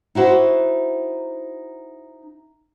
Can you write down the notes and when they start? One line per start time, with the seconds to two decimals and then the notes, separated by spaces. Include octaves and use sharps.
0.15 D#4 E4 F#4 C5